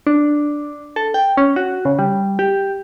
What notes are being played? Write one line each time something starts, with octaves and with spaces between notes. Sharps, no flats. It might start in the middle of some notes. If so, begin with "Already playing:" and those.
D4
A4
G5
C#4
F#4
C#3
G3
G4